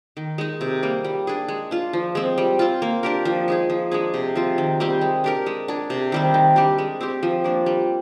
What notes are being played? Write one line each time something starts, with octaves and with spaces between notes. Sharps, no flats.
D#3
G#3 D#4
C3
G3 A#3
G3
D4 G#4
G#3
D4 F4
F3
G#3 C4
G3
C4 F4
A#3
D4 G4 A#4
F3
G#3 D#4 G#4
F3
G#3 D4 G#4
C3
F3 C4 F4
D#3
G3 C4 G4
G#3
D4 G4 A#4
G#3
D4 G#4
C3
D#3 G3 C4
D#3
G3 D4 G4
G#3
C4 G4
F3
A#3 D4
G3